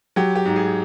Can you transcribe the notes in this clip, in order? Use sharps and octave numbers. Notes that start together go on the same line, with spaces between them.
F#3 G4
G4
G#2
G#4